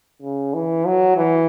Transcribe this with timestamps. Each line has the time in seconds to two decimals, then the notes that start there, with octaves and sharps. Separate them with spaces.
0.22 C#3
0.54 E3
0.85 F#3
1.17 E3